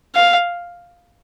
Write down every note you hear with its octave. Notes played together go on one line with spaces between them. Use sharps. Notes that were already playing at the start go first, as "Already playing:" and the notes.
F5